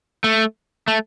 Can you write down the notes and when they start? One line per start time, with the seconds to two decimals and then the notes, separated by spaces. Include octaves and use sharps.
0.24 A3
0.88 A3